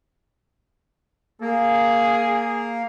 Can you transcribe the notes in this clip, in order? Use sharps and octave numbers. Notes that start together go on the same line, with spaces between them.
A#3 G#4